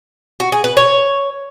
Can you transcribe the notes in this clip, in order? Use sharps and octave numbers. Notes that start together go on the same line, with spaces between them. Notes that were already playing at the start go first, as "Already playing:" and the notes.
F#4
G#4
B4
C#5